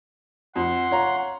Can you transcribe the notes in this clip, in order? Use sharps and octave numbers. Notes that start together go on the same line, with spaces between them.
F2 F#5 C6
C#5 F5 A#5